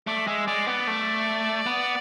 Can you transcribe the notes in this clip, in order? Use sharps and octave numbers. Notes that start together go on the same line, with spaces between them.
A3 D5
G#3 E5
G#3 D5
B3 D5
A3
B3